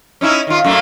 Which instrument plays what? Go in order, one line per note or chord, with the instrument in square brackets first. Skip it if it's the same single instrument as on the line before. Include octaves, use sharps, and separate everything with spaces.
[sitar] C#4 D#4 E4
D#3 F4
F#2 A3 A#3